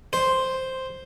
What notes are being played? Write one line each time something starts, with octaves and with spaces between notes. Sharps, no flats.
C5